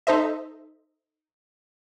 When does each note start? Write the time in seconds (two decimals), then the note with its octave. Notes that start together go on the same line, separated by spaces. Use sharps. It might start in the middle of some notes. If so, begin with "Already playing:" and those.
0.07 D#4 A4 C5 D#5 E5